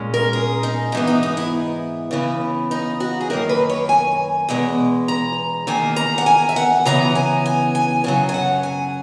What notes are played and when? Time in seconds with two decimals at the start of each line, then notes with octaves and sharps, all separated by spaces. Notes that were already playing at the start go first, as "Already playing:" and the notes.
Already playing: A#2 G#3 C#4
0.14 A#4
0.33 G#4
0.63 D#4
0.92 G#2 E3 B3 D#4
1.07 D#4
1.23 D#4
1.37 E4
2.11 C#3 E3 B3
2.71 D#4
3.00 F#4
3.21 G#4
3.30 F#2 D#3 A#3 A#4
3.49 B4
3.70 C#5
3.89 G#5
4.49 E2 B2 G#3
5.08 A#5
5.67 E2 D#3 A#3 G#5
5.96 A#5
6.18 F#5
6.26 G#5
6.49 E5
6.56 F#5
6.85 C#3 E3 B3 A#5
7.15 G#5
7.46 G#5
7.75 G#5
8.04 F#2 C#3 F#3 G#5
8.29 G#5
8.34 F#5
8.63 G#5